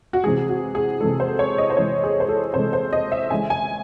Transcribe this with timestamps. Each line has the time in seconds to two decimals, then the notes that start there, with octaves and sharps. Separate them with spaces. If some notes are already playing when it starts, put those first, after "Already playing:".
0.13 F#4
0.24 C3 E3 G#3 G#4
0.49 F#4
0.75 G#4
1.00 C3 E3 G#3 A4
1.20 C5
1.39 C#5
1.58 D#5
1.70 C5
1.77 C3 E3 G#3 C#5
2.04 G#4
2.20 C5
2.28 A4
2.54 C3 E3 G#3 C5
2.73 C5
2.93 D#5
3.12 E5
3.30 C#3 E3 G#3 G#5
3.50 G#5